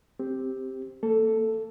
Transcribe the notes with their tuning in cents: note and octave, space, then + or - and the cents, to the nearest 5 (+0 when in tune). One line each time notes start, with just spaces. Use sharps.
C4 +0 G4 +0
A#3 -40 A4 +0